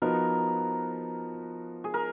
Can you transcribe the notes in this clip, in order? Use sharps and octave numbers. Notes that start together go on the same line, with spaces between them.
F3 B3 D#4 F#4 A#4 B4
G#4
A#4